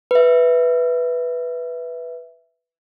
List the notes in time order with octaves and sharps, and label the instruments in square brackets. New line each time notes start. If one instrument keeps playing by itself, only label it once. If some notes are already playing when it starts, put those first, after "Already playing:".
[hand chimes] B4 E5